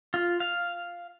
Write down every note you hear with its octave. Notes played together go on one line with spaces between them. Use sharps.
F4
F5